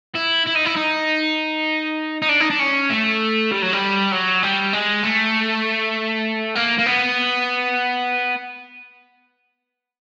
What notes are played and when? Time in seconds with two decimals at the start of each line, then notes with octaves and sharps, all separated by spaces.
0.15 E4
0.47 E4
0.56 D#4
0.66 E4
0.76 D#4
2.22 D#4
2.29 D4
2.41 D#4
2.50 D4
2.60 C#4
2.90 A3
3.51 G3
3.62 F#3
3.73 G3
4.11 F#3
4.43 G3
4.73 G#3
5.04 A3
6.55 A#3
6.79 A#3
6.86 B3